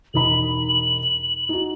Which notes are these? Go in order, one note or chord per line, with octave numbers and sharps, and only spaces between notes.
E1 D#4 B5 F#7
D#4 F#4